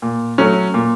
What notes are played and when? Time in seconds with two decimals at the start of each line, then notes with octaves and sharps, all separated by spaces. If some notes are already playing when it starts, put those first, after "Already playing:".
0.02 A#2
0.38 F#3 A3 C#4
0.74 A#2